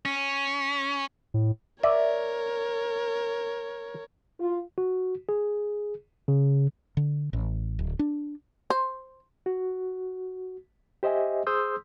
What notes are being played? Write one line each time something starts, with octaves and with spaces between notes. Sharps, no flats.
C#4
A2
A#4 C#5 D5 E5
F4
F#4
G#4
C#3
D3
A1
D1
D4
C5
F#4
G4 C5 D#5 E5 G#5
G#4 C5 C6 D#6 E6 G6